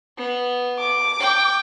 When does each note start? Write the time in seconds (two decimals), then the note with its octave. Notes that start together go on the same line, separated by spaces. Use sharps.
0.17 B3
0.79 D6
1.20 G5